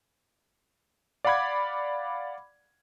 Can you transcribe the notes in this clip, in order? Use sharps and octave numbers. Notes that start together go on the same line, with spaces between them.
D5 F5 F#5 B5 D6 G#6